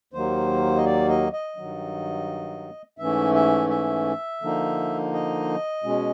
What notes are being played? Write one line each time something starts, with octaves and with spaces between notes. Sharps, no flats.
D#2 D#3 F#3 A#3 C5
D#5
D5
D#5
D#5
G2 D#3 F#3
G#2 E3 A3 C#4 E5
E5
E5
D3 F3 A#3 D#4
D#5
B2 G#3 C#4